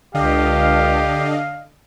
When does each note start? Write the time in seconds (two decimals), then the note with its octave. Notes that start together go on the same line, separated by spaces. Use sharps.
0.14 C#2 D3 D4 G4 D#5 F5